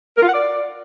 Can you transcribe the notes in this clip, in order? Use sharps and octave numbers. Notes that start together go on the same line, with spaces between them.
A#4
F4
F#5
D5